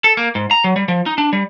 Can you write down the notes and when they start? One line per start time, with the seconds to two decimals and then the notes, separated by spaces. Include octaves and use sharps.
0.04 A4
0.17 A#3
0.35 G#2
0.51 A#5
0.64 F#3
0.76 G3
0.88 F3
1.06 D#4
1.18 D4
1.33 G3